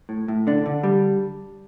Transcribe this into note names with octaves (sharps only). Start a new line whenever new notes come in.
A2
A2
D3 D4
D3
G3